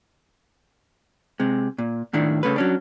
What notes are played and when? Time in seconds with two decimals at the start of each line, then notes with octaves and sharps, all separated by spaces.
1.40 C3 G#3
1.78 A#2
2.13 A2 D#3 D4 E4
2.43 C#3 A3 B4
2.56 F#3 C#4 D4